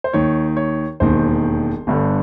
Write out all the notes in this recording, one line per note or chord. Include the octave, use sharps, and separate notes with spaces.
C5
D#2 D#3 C#5
C#5
E1 D#2 D#3 C5
G1 G2 D3